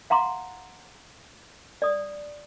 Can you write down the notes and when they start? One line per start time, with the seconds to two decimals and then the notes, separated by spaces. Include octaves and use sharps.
0.10 F5 F#5 A#5 C6 D6
1.82 D5 D#6